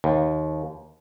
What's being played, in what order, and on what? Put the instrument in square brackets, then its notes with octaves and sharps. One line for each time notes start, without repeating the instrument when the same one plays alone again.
[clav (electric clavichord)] D#2